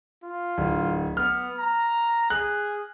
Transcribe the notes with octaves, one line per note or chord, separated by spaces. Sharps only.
F4
D1
B3 F6
A#5
G#4 F#6